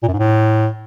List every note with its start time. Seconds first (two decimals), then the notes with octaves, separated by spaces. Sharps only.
0.03 A#2
0.08 F#2
0.13 G#2
0.19 A2